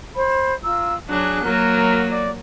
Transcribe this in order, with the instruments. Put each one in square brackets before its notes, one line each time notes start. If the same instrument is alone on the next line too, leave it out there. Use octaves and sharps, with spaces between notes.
[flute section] C5 B5
F4 A#5 E6
[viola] F#3 D4 [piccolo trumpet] G#4 [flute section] F#6
[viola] F#3 A#3 [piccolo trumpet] A#4
[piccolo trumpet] D5